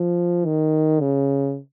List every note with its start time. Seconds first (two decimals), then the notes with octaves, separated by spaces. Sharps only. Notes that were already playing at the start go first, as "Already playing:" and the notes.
Already playing: F3
0.46 D#3
1.01 C#3